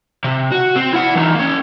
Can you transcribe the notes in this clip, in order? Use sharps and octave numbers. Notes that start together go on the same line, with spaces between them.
C3
F#4
C4
E4 F#5
E3 D#4
A#3 C#4